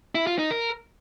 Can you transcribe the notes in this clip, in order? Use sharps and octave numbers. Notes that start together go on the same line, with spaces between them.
E4
F4
D#4
A#4